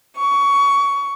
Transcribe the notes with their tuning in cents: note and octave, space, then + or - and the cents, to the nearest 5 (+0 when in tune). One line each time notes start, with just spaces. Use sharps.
C#6 +20